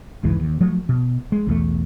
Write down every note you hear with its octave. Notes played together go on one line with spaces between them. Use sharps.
F1 C#2 G#2 E3
D#2
F3 F#3 A3
B2
G#3
B1 E2 A3